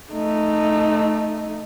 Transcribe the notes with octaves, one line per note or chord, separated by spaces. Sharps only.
A3 D#4